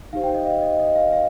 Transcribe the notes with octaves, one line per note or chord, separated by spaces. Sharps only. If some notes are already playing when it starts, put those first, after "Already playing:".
D#4 G4 C5 F5
G5
D#5
F5
D#5
D#5
F5
F5